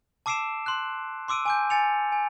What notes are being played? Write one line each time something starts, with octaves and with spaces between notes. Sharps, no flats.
A5 D6 E6 C7 D7 E7
C6 F#6
C6 D6 E6 D7 D#7
G#5 D6 G6
G#5 A6 C#7 F7
G#5